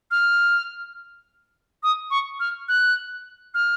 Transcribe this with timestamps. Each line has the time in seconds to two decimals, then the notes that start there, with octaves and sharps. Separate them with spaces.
0.11 F6
1.83 D#6
2.11 C#6
2.40 F6
2.68 F#6
3.54 F6